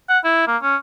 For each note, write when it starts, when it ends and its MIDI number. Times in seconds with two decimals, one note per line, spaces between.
0.09 0.19 78
0.24 0.46 64
0.47 0.57 58
0.62 0.76 61